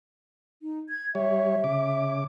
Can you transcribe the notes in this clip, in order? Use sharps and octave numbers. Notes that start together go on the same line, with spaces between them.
D#4
G#6
G3 C#5 E5
C#3 D6